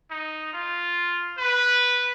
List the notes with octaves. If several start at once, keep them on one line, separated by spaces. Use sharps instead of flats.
D#4
F4
B4